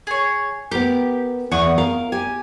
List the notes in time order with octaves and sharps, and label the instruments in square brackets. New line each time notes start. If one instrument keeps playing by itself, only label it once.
[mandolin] G#4 C#5
[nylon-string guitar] B3 A#4 [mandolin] G4
[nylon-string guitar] E2 [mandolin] F#5 C#6 D#6
[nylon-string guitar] A#4 [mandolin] F5
[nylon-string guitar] G4 [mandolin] G#5